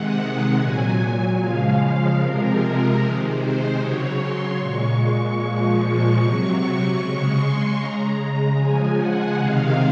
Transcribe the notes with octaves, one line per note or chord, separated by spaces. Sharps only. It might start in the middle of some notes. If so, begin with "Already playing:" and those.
Already playing: C3 D#3 G#3 F#5
F#5
A#2 F#3 G#5
C#3 F3 G#3 F5
C3 F3 G#3 A#4
C3 D#3 G#3
C5
C#3 F#3 C#5
C6
A#2 G#3 C#6
C#6
A#2 F3 G#3
C3 F#3 C#6
C#3 G#3
C6
C#3 G#3 A#5
C#3 F3 G#3 G#5
F#5
C3 D#3 G#3 F5